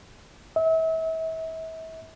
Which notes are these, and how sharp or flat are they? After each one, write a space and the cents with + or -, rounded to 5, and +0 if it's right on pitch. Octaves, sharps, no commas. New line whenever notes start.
E5 -35